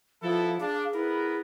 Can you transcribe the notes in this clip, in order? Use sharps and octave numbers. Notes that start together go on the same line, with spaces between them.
F3 B3 E4 A4
D4 G#4 F5
B3 E4 A#4 B4